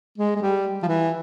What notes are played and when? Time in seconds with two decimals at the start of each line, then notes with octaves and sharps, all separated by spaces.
0.18 G#3
0.36 G#3
0.41 G3
0.83 F3
0.88 E3